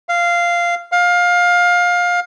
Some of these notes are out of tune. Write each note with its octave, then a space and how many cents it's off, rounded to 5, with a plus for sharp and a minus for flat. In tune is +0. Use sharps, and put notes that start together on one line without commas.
F5 -10
F5 +20